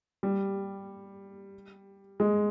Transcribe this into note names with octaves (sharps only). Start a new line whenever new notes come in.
G3
G#3